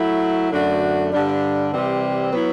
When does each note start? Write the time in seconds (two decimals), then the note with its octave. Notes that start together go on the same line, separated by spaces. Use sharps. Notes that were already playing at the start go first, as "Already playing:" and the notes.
Already playing: F#3 A3 E4
0.51 F#2 D3 A3 D4 F#4
1.12 G2 D3 G3 D4
1.72 C3 E3 G3 C4
2.32 F#3 B3 E4